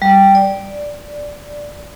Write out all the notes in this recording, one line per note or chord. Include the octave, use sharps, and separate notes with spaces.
G3
D5